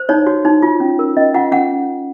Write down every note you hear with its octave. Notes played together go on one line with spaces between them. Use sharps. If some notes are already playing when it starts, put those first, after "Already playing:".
Already playing: C5
D#4 C#5
F#4
D#4
F4
C#4
A#4
C#4 D#5
F4 F#5
C#4 F#5